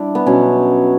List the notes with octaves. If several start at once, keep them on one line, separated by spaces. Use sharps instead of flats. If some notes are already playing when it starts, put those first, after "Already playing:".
Already playing: G3 D4 E4
B3
B2 F#3 C#4